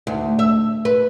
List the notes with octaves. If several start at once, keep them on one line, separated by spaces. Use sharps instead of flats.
D2
E5
B4